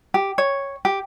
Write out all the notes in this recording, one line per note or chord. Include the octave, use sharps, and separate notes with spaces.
G4
C#5
G4